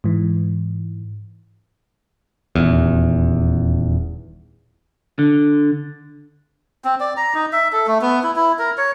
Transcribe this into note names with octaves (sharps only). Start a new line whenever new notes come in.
G#2 E3
D#1 E2
D3
C4
D5
A#5
D#4
E5
A4
A3
B3
E4
E4
A#4
C#5